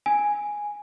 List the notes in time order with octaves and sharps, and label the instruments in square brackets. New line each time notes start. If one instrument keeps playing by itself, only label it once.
[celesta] G#5